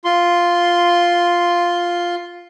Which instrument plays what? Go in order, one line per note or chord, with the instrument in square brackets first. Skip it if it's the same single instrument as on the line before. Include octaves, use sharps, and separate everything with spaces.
[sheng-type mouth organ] F4 C6